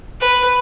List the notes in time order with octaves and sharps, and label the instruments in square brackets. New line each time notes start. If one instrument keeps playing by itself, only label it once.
[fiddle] B4